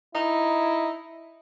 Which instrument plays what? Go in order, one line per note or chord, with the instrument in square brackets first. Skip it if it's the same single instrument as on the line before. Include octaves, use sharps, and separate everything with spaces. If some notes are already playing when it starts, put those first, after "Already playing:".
[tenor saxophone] D#4 [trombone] E4